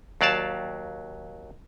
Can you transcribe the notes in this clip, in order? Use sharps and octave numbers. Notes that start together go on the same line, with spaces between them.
D#2 F#3 D5 F5 A5